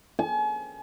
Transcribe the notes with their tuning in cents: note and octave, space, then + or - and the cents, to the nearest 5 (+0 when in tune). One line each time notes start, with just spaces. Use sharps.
G#5 +40